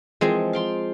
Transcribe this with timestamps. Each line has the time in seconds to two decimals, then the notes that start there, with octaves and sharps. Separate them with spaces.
0.21 E3 F3 G#3 C4 G#4
0.53 F5 G5 C6